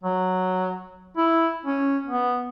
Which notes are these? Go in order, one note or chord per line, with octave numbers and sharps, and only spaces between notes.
F#3
E4
C#4
B3